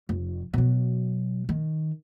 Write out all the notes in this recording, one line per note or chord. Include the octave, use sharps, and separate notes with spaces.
F1
B2 F#3
D#3